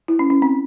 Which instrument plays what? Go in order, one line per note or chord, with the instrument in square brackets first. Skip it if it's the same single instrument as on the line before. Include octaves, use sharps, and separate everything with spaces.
[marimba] E4
C#4
C#4
C4